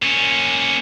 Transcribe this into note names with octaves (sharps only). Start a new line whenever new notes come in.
A#2 C#4